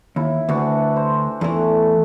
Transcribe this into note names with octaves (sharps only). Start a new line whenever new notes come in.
D#2 E4
D2 E3 D4 F#4
C5
E2 E3 A3